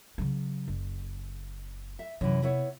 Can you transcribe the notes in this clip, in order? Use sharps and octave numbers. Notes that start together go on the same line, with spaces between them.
C#3 F#3
F#1
E5
F#2 C3 E3
B3 E4 C#5